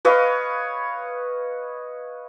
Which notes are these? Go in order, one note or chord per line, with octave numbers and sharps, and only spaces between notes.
B4 C#5 D#5 F5